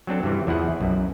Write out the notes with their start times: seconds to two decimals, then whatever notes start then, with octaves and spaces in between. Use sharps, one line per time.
0.07 F#3 C4 D4 A4
0.23 G2 C3 E3
0.47 E2 F3 E4 G#4 F#5
0.80 B1 F#2